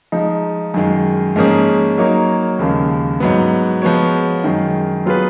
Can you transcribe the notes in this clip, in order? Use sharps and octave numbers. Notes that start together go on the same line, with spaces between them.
F3 G#3 D#4
F#2 D#3 G#3
G#2 F3 A#3 C#4 G#4
F#3 A#3 D#4 A#4 C#5
D#2 C#3 F3 G#3
G#2 F#3 B3
F3 G#3 B3 F#4 C#5
F#2 D#3 G#3
F#3 B3 F4 G#4 B4